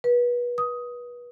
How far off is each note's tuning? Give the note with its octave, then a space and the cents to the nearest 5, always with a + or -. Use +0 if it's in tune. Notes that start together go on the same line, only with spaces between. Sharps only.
B4 -30
D#6 +10